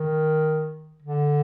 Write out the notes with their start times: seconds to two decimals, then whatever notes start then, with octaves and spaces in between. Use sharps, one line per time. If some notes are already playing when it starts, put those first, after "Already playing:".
Already playing: D#3
1.02 D3